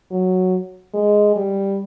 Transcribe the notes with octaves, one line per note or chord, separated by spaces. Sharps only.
F#3
G#3
G3